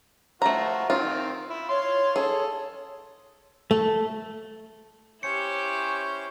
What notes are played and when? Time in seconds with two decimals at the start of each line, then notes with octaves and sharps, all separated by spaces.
0.42 A3 F4 F#4 C5 A#5
0.90 D#3 C4 F4
1.50 E4
1.69 C#5 F5 C6
2.16 G#4 A4
3.71 A3
5.23 C#4 E4 G4 C5 C#5 C#7